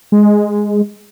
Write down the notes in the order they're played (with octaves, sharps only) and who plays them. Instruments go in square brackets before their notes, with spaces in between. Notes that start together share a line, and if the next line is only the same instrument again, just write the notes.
[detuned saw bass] G#3